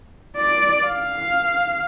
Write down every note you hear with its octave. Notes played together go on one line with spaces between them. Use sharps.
D5
F5